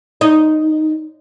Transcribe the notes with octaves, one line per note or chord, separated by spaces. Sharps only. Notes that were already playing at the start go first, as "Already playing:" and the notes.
D#4